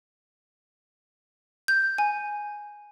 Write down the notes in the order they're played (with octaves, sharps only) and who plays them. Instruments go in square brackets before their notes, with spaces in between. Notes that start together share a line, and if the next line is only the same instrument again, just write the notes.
[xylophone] G6
G#5